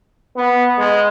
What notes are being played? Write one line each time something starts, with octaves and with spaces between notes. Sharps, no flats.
B3
G#3